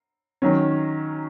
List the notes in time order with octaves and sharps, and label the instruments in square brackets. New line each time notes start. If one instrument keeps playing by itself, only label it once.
[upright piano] D#3 F#3 C#4